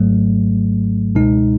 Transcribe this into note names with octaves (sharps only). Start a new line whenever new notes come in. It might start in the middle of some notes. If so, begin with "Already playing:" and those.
Already playing: G#1 G#2 F#3 A3
C#2 B2 G#3 D#4